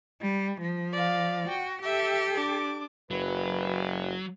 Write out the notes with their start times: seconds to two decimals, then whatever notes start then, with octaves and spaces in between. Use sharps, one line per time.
0.22 G3
0.61 F3
0.93 D5 F5
1.49 F#4 G5
1.83 G4 A4 E5
2.35 D4 D6
3.11 F#1 F#3 B4